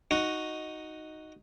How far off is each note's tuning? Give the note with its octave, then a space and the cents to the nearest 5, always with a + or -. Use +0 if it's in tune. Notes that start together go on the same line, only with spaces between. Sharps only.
D#4 +0 F#4 +0